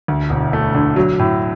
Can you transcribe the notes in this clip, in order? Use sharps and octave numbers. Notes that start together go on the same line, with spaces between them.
D2
E1
A3
D3
F#3
A2